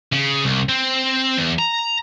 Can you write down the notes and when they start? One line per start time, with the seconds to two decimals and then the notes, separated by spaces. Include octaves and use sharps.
0.13 C#3
0.44 C2
0.69 C4
1.38 E2
1.59 A#5